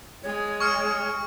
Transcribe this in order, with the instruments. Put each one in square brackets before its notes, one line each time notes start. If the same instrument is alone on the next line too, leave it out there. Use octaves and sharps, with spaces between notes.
[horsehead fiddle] G#3 G#4 [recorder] C#5
[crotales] C#6 F6 C#7